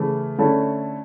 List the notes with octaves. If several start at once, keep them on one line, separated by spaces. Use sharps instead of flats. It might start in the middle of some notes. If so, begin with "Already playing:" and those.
Already playing: C#3 E3 A3
D3 A3 C#4 E4 A4